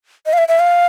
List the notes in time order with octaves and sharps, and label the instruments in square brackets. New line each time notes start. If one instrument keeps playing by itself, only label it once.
[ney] D#5
F5
E5
E5
F5